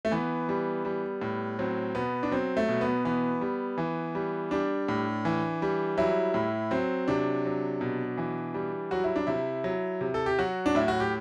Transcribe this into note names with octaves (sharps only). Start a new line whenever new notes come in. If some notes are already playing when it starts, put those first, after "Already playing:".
A3
E3 B3
G3
G3
A2
F#3 C4
B2 B3
D4
F#3 C4
A3
B2
B3
E3 B3
G3
E3
G3
G3 D4
A2
E3
G3
F#3 E4
A2
F#3 C4
C3 D4
F#3
B2
E3
G3
F#3 F#4
E4
D4
C3 E4
F#3
C3
A4
G4
F#3 F#4
D4
A2 E4
F#4
G4